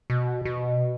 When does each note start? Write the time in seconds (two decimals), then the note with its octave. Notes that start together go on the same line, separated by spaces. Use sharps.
0.10 B2
0.45 B2